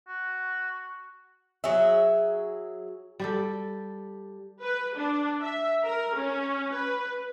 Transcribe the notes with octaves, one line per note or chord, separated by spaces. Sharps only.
F#4
F#3 G#4 E5
G3 G4 A4
B4
D4
E5
A#4
C#4
B4